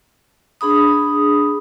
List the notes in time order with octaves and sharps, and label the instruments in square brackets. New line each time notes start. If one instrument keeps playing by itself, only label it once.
[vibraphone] D4 G#4 B5 D#6